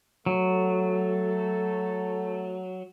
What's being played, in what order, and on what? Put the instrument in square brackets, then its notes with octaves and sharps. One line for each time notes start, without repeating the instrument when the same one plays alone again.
[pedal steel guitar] F#3 [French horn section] A3 A4